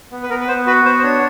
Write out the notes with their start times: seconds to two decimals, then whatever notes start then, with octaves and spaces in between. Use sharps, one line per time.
0.12 B3
0.23 B4
0.30 B3 A#4
0.41 B4
0.48 B3 C5
0.67 F#4 B4
0.85 B3 C5
0.99 C5
1.03 D4 C#5